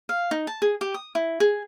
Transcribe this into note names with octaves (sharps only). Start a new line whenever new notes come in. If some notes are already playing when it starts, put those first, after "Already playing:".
F5
D#4
A5
G#4
G4
D#6
E4
G#4